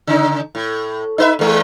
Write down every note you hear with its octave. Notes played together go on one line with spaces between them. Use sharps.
C#3 D#4
A2
D#4 B4 E5
E2 G#3